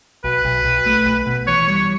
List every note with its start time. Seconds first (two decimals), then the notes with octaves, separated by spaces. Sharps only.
0.24 B1 B4
0.45 B1
0.65 B1
0.86 A3
1.06 B1
1.27 B2
1.47 E3 C#5
1.67 G3 C#5